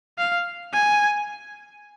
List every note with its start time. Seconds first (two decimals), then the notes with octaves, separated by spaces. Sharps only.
0.18 F5
0.73 G#5